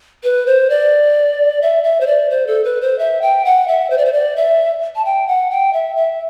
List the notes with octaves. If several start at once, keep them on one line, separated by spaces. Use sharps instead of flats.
B4
C5
D5
E5
E5
C5
D5
C5
A4
B4
C5
E5
G5
F#5
E5
C5
D5
C5
D5
E5
A5
G5
F#5
G5
E5
E5